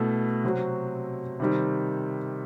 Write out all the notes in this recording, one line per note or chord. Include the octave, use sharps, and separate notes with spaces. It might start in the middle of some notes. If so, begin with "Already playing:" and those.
Already playing: B2 A3 E4 B4
C3 F#3 C4 F#4
C3 D#3 G3